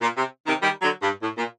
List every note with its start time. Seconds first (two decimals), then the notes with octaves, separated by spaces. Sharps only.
0.01 A#2
0.17 C3
0.47 C3 D#3
0.62 D#3 G3
0.82 D3 F#3
1.02 G2
1.23 A2
1.38 A#2